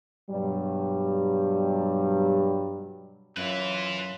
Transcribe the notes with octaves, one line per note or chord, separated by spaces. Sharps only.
G2 B2 F#3 G3
F#2 E4 F4 B4